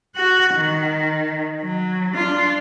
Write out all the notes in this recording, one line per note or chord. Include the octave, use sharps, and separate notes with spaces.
F#4 F#5
D#3
F#3
D4 F4